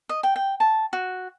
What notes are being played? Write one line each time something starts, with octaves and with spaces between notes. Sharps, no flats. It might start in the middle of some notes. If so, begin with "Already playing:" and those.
D#5
G5
G5
A5
F#4